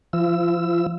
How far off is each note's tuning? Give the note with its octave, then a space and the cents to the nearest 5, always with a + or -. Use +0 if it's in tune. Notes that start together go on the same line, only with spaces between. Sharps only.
F3 -25 F4 -45 E6 +0